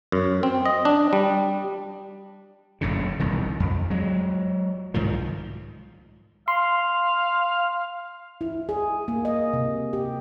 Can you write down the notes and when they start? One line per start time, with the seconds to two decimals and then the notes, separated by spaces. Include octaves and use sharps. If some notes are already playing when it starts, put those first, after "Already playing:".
0.12 F#2
0.43 C4
0.66 D#5
0.85 D4
1.13 G3
2.81 F#1 F#2 A2 C#3
3.20 E1 C2 D#3
3.60 F2
3.90 F#3 G#3
4.94 C2 G#2 D#3 F3
6.48 F5 C6
8.41 E4
8.69 G#4
9.08 A#3
9.25 D#5
9.53 C3
9.93 G4